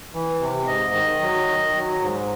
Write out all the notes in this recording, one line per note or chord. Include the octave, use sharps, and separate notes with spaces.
E3
C3
G#2 D#5
D#3
F#3
D#3
F#3
G#2